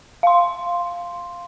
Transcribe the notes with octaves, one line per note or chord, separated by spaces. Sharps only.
F5 C6